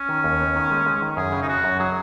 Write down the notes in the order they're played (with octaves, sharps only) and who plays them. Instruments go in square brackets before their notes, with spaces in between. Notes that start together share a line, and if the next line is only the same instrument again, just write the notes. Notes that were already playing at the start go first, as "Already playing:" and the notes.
Already playing: [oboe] C#4
[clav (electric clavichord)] D#3
D#2
B3
D#3
G#3
G#3
D#3
[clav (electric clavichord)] F#2 [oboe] G#4
[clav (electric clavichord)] C#3
[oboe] D#4
[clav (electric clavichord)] F#2 [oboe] F#4
[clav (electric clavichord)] F#2
[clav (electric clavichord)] F#3 [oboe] G#4